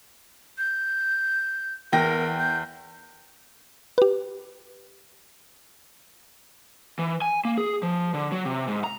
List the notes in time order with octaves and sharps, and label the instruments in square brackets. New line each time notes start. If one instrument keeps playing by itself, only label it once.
[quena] G6
[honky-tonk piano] E2 G5 A#6 [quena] A#4
[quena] G6
[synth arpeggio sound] G4 B4
[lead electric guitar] E3
G#5
A#3
G#4
F3
D3
F#3
C3
G#2
A#5